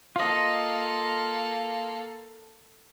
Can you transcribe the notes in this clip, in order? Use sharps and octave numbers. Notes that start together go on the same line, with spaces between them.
A#3 F4 A4 D#5